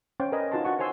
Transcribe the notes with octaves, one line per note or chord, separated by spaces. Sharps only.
C#4 C5 C#5 G5
A#4 B4 D5 D#5 G#5
D#4 F4 F#4 B4 A5 C6
D4 F#4 F#5 C#6
C5 C#5 G#5 C6 E6